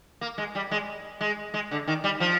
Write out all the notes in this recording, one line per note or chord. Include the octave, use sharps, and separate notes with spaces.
A#3
G#3
G3
G#3
G#3
G#3
D3
D#3
G3
F3